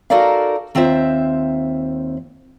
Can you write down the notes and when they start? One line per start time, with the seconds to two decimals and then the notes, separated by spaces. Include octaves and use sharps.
0.10 D#4 F#4 A4 A#4 D5 F5
0.75 D#2 C4 F4 C5 E5